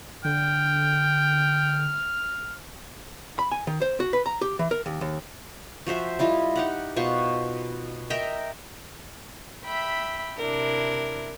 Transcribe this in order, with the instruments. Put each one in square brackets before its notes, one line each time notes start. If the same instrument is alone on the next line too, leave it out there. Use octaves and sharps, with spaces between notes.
[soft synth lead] D3 [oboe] G5 [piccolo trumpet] F6
[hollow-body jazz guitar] B5
G#5
D#3
C5
F#4
B4
A#5
G4
E3
A#4
D#2
D#2
[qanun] F3 F#4 C5 E5
G3 E4 F4 D#5
D#4 G4 F#5
B2 F4 C5 C#6
A#4 D#5 E5 G5
[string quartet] E5 G5 B5
C3 D4 E4 A#4